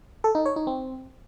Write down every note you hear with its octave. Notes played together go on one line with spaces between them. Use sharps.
A4
D#4
C#5
D#4
C4